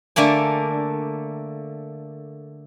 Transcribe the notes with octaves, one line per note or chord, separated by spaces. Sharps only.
D3 A3 A#3 G#5